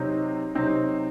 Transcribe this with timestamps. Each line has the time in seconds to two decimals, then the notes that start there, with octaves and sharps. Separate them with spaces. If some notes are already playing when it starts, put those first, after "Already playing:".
Already playing: C3 F#3 C4 D#4
0.55 C3 F#3 C4 D#4